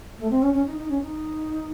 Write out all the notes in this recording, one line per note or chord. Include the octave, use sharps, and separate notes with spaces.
A3
C4
C#4
C#4
D#4
D#4
C#4
D#4